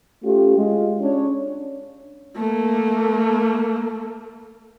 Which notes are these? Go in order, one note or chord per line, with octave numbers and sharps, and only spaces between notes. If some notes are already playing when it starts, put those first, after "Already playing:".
A3 C#4 F4 G4
G#3 F4
C#4 D4 C#5
A3 A#3